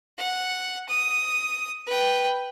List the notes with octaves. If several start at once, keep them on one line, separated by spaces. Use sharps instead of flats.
F#5
D#6
B4 G5